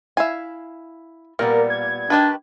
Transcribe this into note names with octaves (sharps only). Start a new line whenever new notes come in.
E4 E5 F5 G#5
A#2 G3 A#3 B3 A#4
G#6
D#3 D4 G4 B4